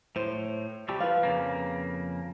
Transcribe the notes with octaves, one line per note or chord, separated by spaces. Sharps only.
A2 C5
C3 G3 A3 G4
F3 B4 F5
F2 C#3 A#3